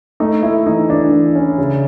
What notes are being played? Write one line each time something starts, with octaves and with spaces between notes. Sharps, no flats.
A3 D#4
A3 E4
E3 D#4
E3 D4
E3
C#4
C#3